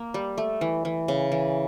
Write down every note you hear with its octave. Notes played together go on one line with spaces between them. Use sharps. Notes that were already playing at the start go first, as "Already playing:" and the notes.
Already playing: A#3
G3
A3
E3
E3
C#3
E3